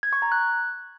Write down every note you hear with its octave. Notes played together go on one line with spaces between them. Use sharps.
G#6
C#6
A#5
F#6